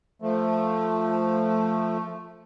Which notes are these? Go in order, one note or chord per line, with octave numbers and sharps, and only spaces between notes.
F3 A3